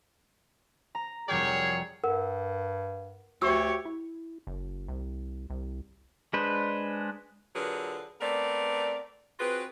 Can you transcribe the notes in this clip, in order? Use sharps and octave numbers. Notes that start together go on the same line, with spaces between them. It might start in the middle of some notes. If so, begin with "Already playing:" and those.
A#5
F1 F#3 G3 G#4 A#4 C#5 G5
G2 A#4 F#5
D2 F#4 G4 C#5 C#6 E6
E4
F#1
C2
C2
G#3 D4 B4 C5
D3 F#3 F4 G#4 A#4 B4
A3 B3 C4 A#4 D5
C4 F4 F#4 G#4 B4